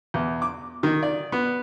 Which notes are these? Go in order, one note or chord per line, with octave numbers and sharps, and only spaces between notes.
E2
D6
D#3
D5
B3